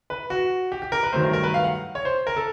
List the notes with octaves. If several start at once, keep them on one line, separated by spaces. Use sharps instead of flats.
B4
F#4
G4
G4
A#4
B4
G2 D#3 F#3 A3 C5
A#4
A#4
B4
F5
F#5
C#5
C5
A#4
A4